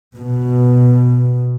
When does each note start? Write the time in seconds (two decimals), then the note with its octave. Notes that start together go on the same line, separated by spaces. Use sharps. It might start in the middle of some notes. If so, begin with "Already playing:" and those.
0.17 B2